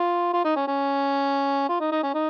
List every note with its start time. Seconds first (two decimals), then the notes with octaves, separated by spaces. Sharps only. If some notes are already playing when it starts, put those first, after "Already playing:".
Already playing: F4
0.34 F4
0.45 D#4
0.56 C#4
0.67 C#4
1.69 F4
1.81 D#4
1.92 D#4
2.03 C#4
2.14 D#4